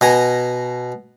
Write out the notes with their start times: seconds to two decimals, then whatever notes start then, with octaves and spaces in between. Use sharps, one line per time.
0.01 B2 G#5 A#5